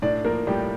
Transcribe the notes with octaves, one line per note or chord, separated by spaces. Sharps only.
A2 D4 D5
F3 A#3 A#4
A2 G3 G4